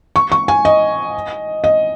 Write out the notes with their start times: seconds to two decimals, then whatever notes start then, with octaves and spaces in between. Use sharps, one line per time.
0.16 C#6
0.32 C#6
0.48 G#5
0.65 D#5
1.64 D#5